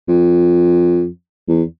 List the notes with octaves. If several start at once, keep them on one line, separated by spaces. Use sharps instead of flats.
F2
E2